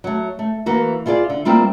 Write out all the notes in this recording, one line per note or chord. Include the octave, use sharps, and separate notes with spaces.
F#3 A3
A3
E3 A#3 F#4
E4 F4 G#4 C#5 D5
D3
G3 A#3 C4 E4 F4